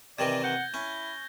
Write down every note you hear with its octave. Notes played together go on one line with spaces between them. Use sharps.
C3 D#3 E3 D5 G#6 A#6
F#5 G6 G7
C#4 E4